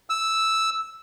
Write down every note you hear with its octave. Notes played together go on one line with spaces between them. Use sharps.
E6